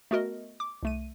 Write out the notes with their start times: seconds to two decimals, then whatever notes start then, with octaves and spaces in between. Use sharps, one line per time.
0.11 A3 B3 F#4 A#4 D#5
0.60 D6
0.83 C2 A3 D#7